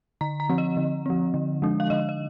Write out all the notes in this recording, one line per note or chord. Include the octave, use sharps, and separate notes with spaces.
D3 A#5
A#5
F3 C4
D#5
D3
F3 C4
D3
F3 G#3 D4
F5
D3 D#5
D#5